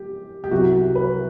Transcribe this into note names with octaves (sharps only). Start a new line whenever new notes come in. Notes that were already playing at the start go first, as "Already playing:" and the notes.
Already playing: G4
G4
C2 C3 F#3 F#4
B4